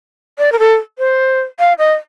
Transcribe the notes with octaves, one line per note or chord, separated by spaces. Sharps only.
D5
A#4
A4
C5
F5
D#5